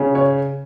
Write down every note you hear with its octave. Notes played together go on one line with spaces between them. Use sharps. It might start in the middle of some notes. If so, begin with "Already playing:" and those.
Already playing: C#3
C#5